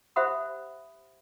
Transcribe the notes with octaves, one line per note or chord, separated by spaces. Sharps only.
G4 C5 E5 F#5 B5 D#6